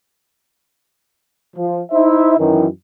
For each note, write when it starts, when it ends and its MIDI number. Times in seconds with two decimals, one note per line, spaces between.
1.57 1.80 53
1.92 2.35 63
1.92 2.35 64
1.92 2.35 72
1.92 2.35 76
2.39 2.67 42
2.39 2.67 51
2.39 2.67 52